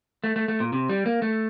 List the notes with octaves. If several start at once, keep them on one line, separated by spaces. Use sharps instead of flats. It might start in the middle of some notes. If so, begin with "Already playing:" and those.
A3
A3
A3
A#2
C3
G3
A#3
A3